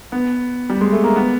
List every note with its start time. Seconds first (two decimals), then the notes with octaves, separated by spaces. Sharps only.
0.12 B3
0.70 G3
0.81 G#3
0.92 A3
1.04 A#3
1.16 B3